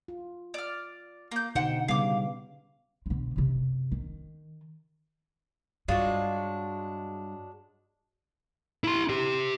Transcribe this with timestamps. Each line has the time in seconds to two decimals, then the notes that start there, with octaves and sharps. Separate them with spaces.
0.08 F4
0.54 D5 F6
1.31 A#3 G6
1.55 B2 D3 D#4 C5 F#5 G5
1.88 C#3 G3 B3 F5 D6
3.06 B2 D3
3.36 F#2 C3
3.92 D#3
5.88 G2 F#3 G#3 D4 F4 F#4
8.84 E4 C6
9.10 G4 C6